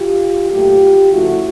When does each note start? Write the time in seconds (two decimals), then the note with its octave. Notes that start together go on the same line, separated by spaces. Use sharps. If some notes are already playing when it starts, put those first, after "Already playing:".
Already playing: F4 G4
0.51 A#2 F#3 A3 F4 G4
1.12 D2 C#3 F3 A3 E4 F#4